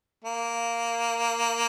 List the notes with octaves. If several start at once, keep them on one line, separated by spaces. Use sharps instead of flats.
A#3